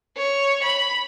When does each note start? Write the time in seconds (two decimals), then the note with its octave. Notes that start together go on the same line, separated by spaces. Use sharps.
0.17 C#5
0.63 B5